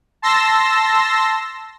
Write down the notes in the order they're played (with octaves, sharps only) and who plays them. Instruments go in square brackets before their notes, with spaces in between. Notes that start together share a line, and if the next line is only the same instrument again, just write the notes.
[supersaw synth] A5 C6 E6 A#6